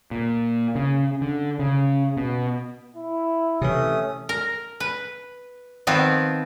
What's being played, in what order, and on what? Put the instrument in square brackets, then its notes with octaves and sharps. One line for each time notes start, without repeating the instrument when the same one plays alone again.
[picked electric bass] A#2
C#3
D3
C#3
B2
[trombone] E4
[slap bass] C3 E3 [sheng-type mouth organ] A3 C#4 D#6
[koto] A#4
B4
D#3 F3 B3 C4